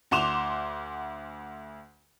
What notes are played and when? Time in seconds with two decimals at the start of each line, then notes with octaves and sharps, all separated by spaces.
0.11 D2 F#5 C6 D6 E7 F7